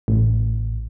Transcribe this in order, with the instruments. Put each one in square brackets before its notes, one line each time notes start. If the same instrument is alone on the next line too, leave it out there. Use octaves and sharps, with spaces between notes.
[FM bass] A1